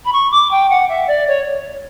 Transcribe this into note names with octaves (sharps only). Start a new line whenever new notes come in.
B5
C#6
D6
G5
F#5
E5
D5
C#5